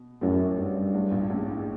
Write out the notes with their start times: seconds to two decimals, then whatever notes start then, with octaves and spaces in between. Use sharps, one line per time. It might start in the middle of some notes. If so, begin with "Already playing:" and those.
Already playing: B2
0.21 A1 F#2 A2
0.58 G2
0.94 A1 A2
1.11 A#1 A#2
1.30 A1 A2
1.48 G#2